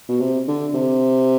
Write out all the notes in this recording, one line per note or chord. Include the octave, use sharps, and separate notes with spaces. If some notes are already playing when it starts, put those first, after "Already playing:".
B2
C3
D3
C3